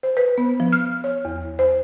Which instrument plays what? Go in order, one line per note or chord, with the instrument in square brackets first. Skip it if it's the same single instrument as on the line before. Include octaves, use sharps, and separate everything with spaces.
[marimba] C5
B4
B3
F3
F6
C#5
E2
C5